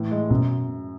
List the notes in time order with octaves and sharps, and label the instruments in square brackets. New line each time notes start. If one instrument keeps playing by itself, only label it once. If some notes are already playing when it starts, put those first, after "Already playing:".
Already playing: [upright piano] A2 E3
G#3
[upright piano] F#2 [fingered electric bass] B2